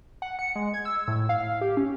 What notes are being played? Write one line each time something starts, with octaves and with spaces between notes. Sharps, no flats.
F#5
C#7
G#3
G#6
E6
A2
F5
G4
C#4